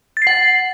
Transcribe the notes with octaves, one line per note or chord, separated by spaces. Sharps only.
F#5 A6 C7